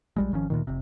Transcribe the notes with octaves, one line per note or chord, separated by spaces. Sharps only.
A#1 G3 G#3
G#1 D#3 F3 C#4
D2 A#2 D#3
F1 C3